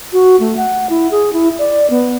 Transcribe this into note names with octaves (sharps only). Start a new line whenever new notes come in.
F#4
A3
F#5
E4
G#4
E4
D5
B3